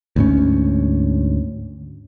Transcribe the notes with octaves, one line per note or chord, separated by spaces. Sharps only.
D2 G#2 C#4